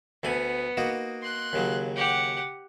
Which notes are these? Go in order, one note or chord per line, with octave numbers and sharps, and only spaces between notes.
D2 A3 B3 G#5
A#3 D#4 F#4
C6 F#6
D#2 C#3 F#3
G4 F#5